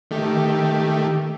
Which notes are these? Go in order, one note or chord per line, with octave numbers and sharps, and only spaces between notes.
D#3 A3 G4